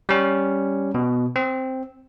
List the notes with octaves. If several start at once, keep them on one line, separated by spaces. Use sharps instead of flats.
G3 C#4
B2
C4